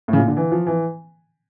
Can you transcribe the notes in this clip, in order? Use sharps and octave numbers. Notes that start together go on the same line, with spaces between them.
A2 C#3
A#2
D3
E3
F3
E3